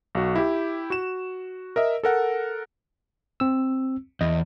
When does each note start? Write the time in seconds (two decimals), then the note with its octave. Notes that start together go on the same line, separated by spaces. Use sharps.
0.15 B1 F#4
0.36 E4 G4
0.90 F#4 E7
1.76 A#4 D#5 E5
2.03 A4 A#4 F#5
3.40 C4 E6
4.21 E2 D#5